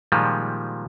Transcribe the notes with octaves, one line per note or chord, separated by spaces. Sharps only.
A#2 D#3 F3 G3 G#3